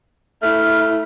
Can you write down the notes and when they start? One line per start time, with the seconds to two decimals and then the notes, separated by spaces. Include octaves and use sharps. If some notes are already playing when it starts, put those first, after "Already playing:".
0.42 A3 E4 F6